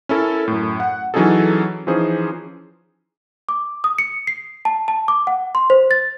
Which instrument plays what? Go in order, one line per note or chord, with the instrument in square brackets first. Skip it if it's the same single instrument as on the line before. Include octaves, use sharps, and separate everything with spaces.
[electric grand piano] C#4 E4 A4 A#4
F#2 A2
F#5
E3 F#3 C#4 D#4 G#4 A4
E3 F3 C#4 D#4 G#4 C5
[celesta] D6
D#6
C#7
C7
A5
A5
D6
F#5
C6
C5
A6